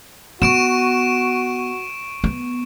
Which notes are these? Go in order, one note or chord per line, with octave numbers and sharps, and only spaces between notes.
B3 F#4 C#6 D7 E7
B3